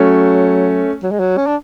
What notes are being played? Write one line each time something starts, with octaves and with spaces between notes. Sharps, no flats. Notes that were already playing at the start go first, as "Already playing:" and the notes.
Already playing: F#3 A3 C#4
F#3
G#3
F#3
C#4
D4